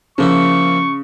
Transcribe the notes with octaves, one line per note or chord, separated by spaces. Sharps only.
C#3 F3 A#3 E4 C#6